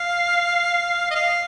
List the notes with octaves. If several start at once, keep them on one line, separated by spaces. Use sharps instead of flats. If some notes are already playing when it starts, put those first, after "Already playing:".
Already playing: F5
D#5
F5